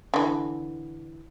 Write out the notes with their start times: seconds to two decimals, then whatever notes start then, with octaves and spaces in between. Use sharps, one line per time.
0.14 D3 E3